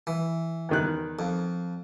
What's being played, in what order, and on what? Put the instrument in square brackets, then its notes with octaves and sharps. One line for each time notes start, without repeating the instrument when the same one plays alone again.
[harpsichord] E3
[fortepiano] E2 D#3 F#6
[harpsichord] F2